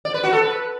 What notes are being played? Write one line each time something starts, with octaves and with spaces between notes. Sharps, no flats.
D5
B4
F#4
A4
B4